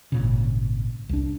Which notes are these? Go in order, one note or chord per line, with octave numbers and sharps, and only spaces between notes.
G#1 A#2 C#3
C2 D4